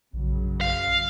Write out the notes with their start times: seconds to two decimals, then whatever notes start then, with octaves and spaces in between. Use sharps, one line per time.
0.13 A#1 F#2 C#3 F#3
0.61 F5